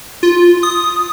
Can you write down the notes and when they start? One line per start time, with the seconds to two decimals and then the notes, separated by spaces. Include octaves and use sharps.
0.23 F4
0.63 D#6